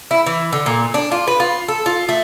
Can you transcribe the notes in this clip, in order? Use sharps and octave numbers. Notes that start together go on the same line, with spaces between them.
E4
E3
D3
A#2
D4
F4
B4
F4
A4
F4
A3